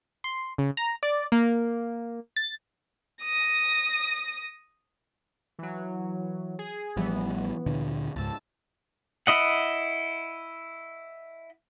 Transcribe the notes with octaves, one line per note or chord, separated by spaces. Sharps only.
C6
C#3
A#5
D5
A#3
A6
D#6 A#6
E3 F#3
G#4
A1 E3 F3 G3 B3
D2 A#2 D3
C#2 G#2 A5 E6
E4 D#5 F#5